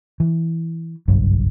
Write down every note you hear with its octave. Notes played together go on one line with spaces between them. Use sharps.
E3
F#1 B1 G2 F#3